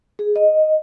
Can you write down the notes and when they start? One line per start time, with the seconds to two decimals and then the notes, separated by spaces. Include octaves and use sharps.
0.19 G#4
0.36 D#5